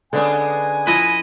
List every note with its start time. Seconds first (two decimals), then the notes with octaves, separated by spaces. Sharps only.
0.13 D3 G#3 B3 C#4 D4 G#5
0.87 F3 E4 B4 D#5